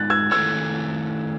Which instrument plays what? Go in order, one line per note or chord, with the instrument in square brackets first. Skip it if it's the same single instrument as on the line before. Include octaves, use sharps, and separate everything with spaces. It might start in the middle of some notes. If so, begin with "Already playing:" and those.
Already playing: [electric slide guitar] G#3 D#4 F#4 B4 [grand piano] F#6 A6
[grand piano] E6 G#6
[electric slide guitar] D#3 A3 E4 A4 C#5 [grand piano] E6 G#6